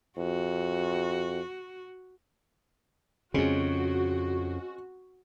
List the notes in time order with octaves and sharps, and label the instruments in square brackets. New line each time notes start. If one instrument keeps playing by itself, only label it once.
[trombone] F2 [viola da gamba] F#4
[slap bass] F2 C#3 [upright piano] G#3 C4 C#4 [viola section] F#4